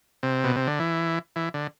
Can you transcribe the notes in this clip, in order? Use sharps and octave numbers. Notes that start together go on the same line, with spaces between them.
C3
B2
C3
D3
E3
E3
D3